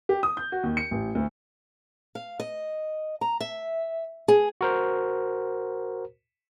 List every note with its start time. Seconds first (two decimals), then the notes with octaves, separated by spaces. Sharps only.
0.09 G4
0.23 D#6
0.37 G6
0.52 F#4
0.63 D#2
0.77 C#7
0.91 A1
1.15 D2
2.15 F5
2.40 D#5
3.21 A#5
3.40 E5
4.28 G#4
4.61 F#4 A#4 C5